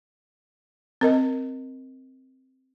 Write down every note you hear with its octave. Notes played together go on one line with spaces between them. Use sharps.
C4 A#4 D#5